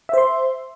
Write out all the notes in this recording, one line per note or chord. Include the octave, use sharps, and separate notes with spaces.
C5 E5 C6